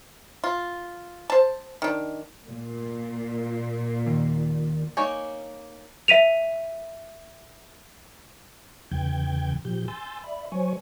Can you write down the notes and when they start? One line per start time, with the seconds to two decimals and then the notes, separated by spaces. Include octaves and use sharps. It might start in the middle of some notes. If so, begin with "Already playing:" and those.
0.44 F4
1.30 C5 A5
1.82 D#3 D4
2.46 A#2
4.06 D#2
4.97 A#3 D#4 C#5 G#5
6.08 E5 B6 D#7 F7
8.92 E2 C#3 E3 G5 G6 G#6
9.65 A#2 F3 G4 G6
9.88 G#5 C6 E6 G6 A6
10.24 D5 E5 B5
10.52 F#3 C5 C#5 G#5 C#6